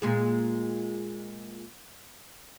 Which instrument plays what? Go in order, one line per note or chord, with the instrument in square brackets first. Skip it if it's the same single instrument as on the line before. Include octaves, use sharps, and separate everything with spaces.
[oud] A#2 G#3 G#4